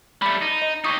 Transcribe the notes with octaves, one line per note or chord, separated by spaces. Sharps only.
G3 A3 B5 C#7
D#4
D#5
D#4 G4 C#6 D#6